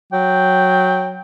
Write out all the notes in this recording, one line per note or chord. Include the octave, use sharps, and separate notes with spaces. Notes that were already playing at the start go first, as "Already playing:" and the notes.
F#3 G5